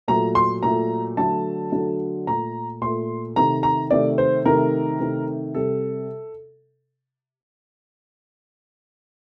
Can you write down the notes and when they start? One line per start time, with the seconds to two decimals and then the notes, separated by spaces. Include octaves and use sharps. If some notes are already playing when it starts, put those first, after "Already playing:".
0.08 A#2 F#3 A3 A#5
0.35 C6
0.63 A#2 F#3 A3 A#5
1.17 D3 F#3 A3 A5
1.72 D3 F#3 A3
2.27 A#2 A3 A#5
2.82 A#2 A3 C6
3.36 C3 D#3 A3 A#5
3.63 A#5
3.91 C3 D#3 A3 D5
4.18 C5
4.45 C3 D#3 A3 A#4
5.00 C3 D#3 A3
5.55 C3 G3 A4